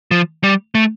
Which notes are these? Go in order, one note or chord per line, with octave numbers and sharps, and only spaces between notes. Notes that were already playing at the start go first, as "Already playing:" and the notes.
F3
G3
A3